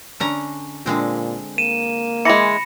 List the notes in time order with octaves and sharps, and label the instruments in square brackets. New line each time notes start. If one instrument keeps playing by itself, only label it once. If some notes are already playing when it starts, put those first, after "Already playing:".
[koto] D3 C#4 A#5
[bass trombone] A#2 [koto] D3 G#3 C4
[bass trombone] A#3 [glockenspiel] D#7 E7
[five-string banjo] E3 G#3 [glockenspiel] B5 A#6 C#7